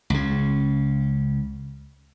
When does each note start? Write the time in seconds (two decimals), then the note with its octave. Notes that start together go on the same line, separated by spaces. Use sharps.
0.10 C#2 C#3